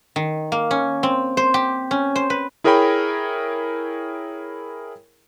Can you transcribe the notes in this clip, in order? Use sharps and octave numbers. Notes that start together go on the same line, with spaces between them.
D#3
A#3
C#4
C4
C5
G4
C#4
C5
B4
E4 G#4 A#4 C#5 G5 B5